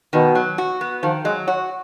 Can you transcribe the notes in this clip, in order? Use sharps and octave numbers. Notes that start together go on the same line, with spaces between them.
B2 D#3
F#3
F#4
B3
D#3 F3
F#3 G#3
F#3 F#4